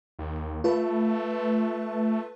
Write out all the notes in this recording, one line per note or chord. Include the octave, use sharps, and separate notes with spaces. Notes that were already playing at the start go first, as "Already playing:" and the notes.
D#2
A3 F4 B4